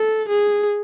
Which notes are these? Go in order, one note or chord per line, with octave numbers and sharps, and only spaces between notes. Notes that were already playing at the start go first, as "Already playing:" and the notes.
Already playing: A4
G#4